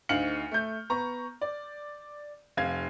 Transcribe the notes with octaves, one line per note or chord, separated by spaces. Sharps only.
D2 D#4 F5 F6 C#7 F#7
A3 G6
B3 A#5 C#6
D5
F1 F5 G#6